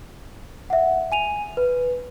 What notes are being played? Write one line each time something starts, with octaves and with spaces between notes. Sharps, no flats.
E5 F#5
G#5 D#7 F7
B4